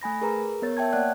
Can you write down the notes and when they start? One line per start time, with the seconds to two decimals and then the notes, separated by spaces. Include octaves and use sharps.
0.02 A3 G#5 B5 A#6
0.21 G#4 A#4 B4 A#5
0.62 B3 A#4 C#5 A6
0.77 C#5 E5 G5 A5 G#6
0.93 A#3 C#5 D5 F#5 F#6